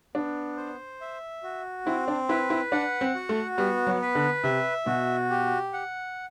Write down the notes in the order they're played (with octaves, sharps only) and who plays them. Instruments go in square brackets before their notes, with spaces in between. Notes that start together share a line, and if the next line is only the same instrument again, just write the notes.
[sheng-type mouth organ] B3 [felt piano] D4
[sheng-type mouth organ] C5
E5
F#4
[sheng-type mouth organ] C4 [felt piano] E4
[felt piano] D4
[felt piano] E4 [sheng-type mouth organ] B4
[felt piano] E4
[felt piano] D4 [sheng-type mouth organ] F#5
[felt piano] C4
[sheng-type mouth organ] F#4
[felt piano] A3
[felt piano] G3 [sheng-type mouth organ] B3
[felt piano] F#3
[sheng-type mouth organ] B4
[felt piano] D3
[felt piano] C3 [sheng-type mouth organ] E5
[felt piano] B2 [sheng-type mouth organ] F#4
[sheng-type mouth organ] G4
F#5